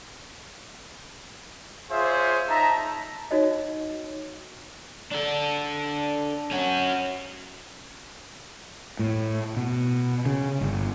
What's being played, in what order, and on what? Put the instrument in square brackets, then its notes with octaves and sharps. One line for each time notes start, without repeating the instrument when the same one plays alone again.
[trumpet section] F4 G#4 C5 C#5 E5
D#4 E5 A5 A#5
[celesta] D#4 F#4 C#5 D#5
[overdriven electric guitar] D4 A4
C#4 F#4
[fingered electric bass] A2
B2
C#3
G1